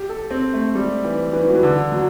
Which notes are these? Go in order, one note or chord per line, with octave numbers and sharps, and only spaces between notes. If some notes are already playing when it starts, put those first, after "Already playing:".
Already playing: G4
A4
C4
A3
G3
E3
E3
F#3
E3
D3
F#3